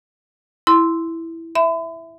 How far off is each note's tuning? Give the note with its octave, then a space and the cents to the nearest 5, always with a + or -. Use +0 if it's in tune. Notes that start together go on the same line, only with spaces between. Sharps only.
E4 +0 C6 -5
E5 +0 B5 +40